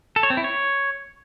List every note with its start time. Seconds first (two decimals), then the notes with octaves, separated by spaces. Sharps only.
0.16 A4
0.23 C#5
0.30 C4
0.37 E4
0.44 C#5